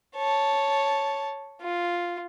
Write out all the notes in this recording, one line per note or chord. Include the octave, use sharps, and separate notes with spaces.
C#5 A5
F4